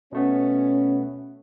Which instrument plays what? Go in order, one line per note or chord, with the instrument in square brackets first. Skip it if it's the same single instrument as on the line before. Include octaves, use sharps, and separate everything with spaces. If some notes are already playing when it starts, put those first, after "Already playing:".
[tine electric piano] B2 A3 B3 [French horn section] C#4